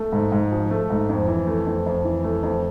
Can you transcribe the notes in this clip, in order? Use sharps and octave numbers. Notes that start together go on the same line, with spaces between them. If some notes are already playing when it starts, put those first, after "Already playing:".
Already playing: A3
G#2
G#2
F3
A3
G#2
F2
E3
A3
F2
F2
E3
A3
F2